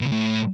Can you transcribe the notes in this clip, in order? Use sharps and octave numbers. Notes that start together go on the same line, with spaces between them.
B2
C#3
A2